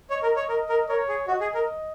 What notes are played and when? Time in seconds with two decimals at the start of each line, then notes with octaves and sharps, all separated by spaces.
0.10 C#5 D#5
0.23 A#4
0.36 C#5
0.49 A#4 D#5
0.69 A#4
0.88 A#4 C#5
1.08 G#4
1.27 F#4 D#5
1.40 G#4
1.54 A#4